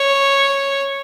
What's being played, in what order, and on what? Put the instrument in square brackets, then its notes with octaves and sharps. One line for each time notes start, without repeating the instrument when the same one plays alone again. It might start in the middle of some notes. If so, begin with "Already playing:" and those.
Already playing: [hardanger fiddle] C#5